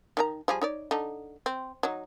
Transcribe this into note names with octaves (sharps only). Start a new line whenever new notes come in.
D#3 D4 A#5
F3 G3 G#4
D#4 C#5 D5
D3 D#4
C4
F#3 D#4